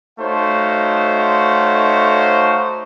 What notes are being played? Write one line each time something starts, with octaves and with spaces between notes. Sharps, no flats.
A3 D#4 F#4 C5 C#5 F5